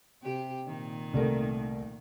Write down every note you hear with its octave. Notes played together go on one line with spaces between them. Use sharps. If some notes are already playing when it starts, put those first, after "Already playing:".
C3 G4
A#2 D#3
C2 A3 A#4